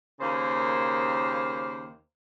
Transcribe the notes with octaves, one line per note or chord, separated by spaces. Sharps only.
D#2 C#3 A#3 C5